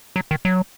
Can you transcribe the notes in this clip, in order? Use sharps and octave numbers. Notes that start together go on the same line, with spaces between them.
F#3
D#3
F#3